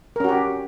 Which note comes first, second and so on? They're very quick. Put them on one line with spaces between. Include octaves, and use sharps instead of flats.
A#4 C#4 F#4 G4